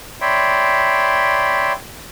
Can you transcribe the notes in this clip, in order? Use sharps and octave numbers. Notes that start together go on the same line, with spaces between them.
C#5 D5 E5 G5 B5 C6